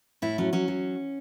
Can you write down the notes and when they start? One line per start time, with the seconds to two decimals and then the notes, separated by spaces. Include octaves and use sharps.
0.22 A2 E4
0.38 F#3 C#4
0.53 F#3 C#4
0.68 F#3